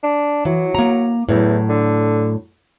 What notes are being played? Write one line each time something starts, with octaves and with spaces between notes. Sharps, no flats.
D4
E3 F#3
A#3 A#5
E2 A2 F#3
D3